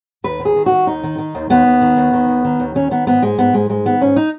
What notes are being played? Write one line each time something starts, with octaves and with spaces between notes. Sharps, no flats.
D#2 B4
D#3
G#4
D#3
F#4
D#3
D#2 D#4
D#3
D#3
D#2
D#2 B3
D#2
D#3
D#2
D#3
D#2
D#3
D#2
D#3 C#4
D#3 B3
G#2 B3
G#2 G#3
G#2 B3
G#2 G#3
G#2 G#3
D#3 B3
G#2 C#4
D#4